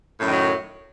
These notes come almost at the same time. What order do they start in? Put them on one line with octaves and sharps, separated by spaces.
A2 F#2 D#3 F#3